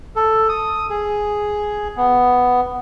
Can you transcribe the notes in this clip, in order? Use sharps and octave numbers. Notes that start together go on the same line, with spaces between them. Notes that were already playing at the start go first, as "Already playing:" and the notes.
A4
D#6
G#4
B3